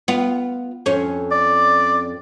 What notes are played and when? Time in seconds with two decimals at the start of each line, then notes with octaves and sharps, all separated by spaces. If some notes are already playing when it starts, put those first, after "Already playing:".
0.08 B3 F4
0.86 F2 C#4
1.31 D5